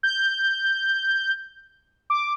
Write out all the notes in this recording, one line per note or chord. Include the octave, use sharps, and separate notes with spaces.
G6
D6